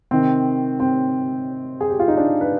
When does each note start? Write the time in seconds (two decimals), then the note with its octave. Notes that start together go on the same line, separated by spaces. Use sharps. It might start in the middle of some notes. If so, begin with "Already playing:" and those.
0.11 C3 D#3 C4
0.80 C4
1.81 G#4
1.90 G4
1.99 F4
2.08 D#4
2.17 D4
2.41 B4